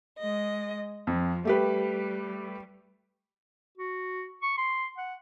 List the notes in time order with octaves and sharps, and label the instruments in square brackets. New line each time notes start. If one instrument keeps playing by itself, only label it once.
[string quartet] G#3 D#5
[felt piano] F2 [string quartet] F3
[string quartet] G3 [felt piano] A3 G4 B4
[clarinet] F#4
C#6
C6
F#5